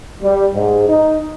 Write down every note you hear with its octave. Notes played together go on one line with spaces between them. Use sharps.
G3
G#2
D#4